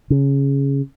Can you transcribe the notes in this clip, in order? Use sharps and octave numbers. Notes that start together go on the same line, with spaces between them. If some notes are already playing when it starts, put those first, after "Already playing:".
C#3